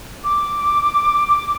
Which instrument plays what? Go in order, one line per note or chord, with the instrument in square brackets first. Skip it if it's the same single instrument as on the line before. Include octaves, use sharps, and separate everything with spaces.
[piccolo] D6